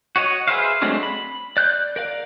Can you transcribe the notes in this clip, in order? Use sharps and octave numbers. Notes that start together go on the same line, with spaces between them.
F#4 C#5 D#5
G#4 B4 C5 E5 F5
F#3 G#3 A3 C4 D4
B5
D5 F#6 G6
A#4 D5 F5